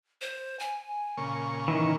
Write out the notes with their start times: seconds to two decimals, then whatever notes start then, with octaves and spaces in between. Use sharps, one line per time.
0.21 C5
0.59 G#5
1.17 A#2 C#3 C#6
1.68 D#3 E3